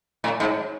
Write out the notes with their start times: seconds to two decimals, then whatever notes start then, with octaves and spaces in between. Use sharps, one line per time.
0.24 A2
0.40 G#2